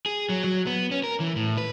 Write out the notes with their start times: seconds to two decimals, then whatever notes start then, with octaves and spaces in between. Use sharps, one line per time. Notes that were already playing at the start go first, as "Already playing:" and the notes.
0.06 G#4
0.29 F#3
0.44 F#3
0.67 B3
0.91 C#4
1.04 A#4
1.20 E3
1.36 A2
1.58 B4